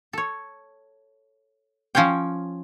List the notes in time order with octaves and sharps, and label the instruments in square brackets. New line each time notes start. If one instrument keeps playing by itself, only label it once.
[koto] A4 C#5
F3 C#4 C#5 F5 G5